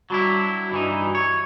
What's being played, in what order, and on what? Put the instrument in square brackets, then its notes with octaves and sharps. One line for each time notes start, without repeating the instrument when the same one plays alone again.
[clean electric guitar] F#3 D4 E4 [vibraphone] G3 F#4 B5
[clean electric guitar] G2 E3 D#4
C#5